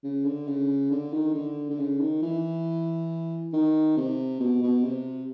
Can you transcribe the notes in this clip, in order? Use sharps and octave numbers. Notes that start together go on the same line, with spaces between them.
C#3
D3
C#3
D3
D#3
D3
D3
C#3
D#3
E3
D#3
C3
B2
B2
C3